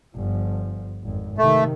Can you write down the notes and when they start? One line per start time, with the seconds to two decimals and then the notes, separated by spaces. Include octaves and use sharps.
0.15 G1 F3
1.03 G#1 F2
1.38 C3 D#3 A3